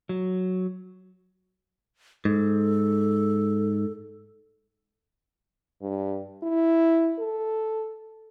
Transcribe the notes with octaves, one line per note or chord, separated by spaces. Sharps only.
F#3
G#2 A4
G2
E4
A4